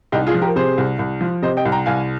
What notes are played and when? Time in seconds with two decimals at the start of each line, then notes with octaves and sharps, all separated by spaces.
0.12 C2 D#4 G4
0.27 F4 G#4
0.34 F3
0.42 G4 A#4
0.56 C3 G#4 C5
0.78 C2
0.99 C2
1.21 F3
1.42 C3 C5 D#5
1.57 D#5 G5
1.65 C2
1.72 G5 A#5
1.86 C2 F5 G#5